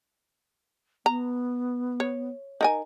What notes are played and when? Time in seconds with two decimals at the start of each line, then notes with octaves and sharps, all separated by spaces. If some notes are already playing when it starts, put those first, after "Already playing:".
1.06 B3 A#5
2.00 C#5
2.61 D#4 A#4 G#5